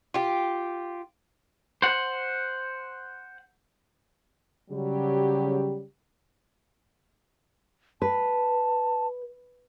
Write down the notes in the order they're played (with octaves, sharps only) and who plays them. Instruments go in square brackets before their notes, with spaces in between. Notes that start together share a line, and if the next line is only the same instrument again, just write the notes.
[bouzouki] F4 G4
[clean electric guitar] C5 F#5
[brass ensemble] C#3 F#3 G3 G4
[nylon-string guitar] B4 [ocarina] A5